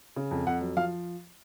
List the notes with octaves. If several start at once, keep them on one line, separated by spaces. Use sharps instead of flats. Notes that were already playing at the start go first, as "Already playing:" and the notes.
C#3
F2
F2 F#5
F#3
F3 F5